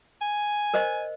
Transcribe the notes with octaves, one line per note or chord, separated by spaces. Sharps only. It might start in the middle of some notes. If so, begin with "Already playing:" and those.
G#5
A#4 C5 D#5